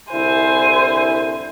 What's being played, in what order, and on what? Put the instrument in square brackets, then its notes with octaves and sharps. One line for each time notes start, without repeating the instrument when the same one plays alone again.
[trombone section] C2 D3 E4 [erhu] C5 [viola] G#5